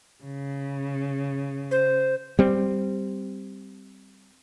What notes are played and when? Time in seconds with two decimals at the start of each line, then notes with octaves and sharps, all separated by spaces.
0.25 C#3
1.71 C5
2.39 G3 C4